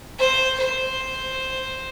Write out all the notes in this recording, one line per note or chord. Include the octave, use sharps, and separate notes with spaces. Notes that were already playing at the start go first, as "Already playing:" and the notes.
C5
C5